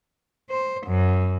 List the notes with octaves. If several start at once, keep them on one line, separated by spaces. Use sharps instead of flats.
C5
F#2